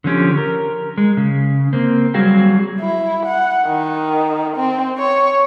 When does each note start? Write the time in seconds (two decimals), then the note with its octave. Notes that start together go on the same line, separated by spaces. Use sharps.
0.04 D3 F3 C#4 G4
0.37 A#4
0.98 G#3
1.17 C#3
1.73 A#3 C4
2.14 F#3 G3 F#4 G#4 F5 G5
2.80 E4
3.26 F#5
3.66 D#3
4.57 C4
4.99 C#5